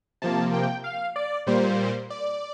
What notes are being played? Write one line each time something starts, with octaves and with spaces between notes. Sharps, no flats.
C3 F3 A#3 A5
G5
F5
D5
A#2 G3 A#3 C5
D5